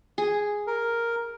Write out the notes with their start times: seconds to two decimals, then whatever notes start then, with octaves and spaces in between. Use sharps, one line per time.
0.18 G#4
0.67 A#4